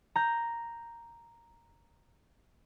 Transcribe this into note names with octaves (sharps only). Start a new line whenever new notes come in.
A#5 G6